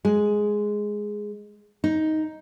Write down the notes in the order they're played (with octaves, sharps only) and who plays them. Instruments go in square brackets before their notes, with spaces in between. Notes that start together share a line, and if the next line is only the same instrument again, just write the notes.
[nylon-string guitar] G#3
D#4